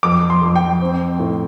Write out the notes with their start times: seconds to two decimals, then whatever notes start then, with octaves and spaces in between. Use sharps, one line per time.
0.03 F2 D6
0.30 C6
0.42 F2
0.56 G5
0.82 C4
1.19 A2